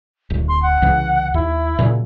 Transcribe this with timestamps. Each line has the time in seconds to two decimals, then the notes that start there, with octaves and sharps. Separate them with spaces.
0.30 D1
0.48 C6
0.62 F#5
0.82 C2 C#3 E3
1.34 D#2 E4
1.79 A#2 C#3 F#3